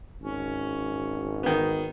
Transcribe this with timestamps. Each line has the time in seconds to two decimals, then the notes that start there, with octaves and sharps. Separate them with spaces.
0.22 G#1 C#4
1.43 D#3 B3